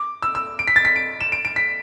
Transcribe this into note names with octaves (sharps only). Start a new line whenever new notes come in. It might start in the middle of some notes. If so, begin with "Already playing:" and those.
Already playing: D6
E6
E6
D7
B6
A6
B6
D7
E7
D7
D7
B6